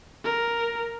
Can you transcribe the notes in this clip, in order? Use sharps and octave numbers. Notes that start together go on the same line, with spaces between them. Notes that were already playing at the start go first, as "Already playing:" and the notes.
A#4